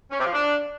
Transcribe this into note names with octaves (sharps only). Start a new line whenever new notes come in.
C#4
C3
F3
D4